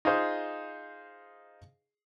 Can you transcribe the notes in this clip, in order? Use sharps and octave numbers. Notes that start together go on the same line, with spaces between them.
D#4 F4 G#4 C5